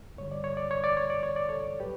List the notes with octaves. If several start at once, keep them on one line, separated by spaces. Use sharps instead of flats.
G2 D3 G3 C#5
D5
C#5
D5
C#5
D5
C#5
D5
C#5
D5
A4 C#5
A2 F#3 G4 B4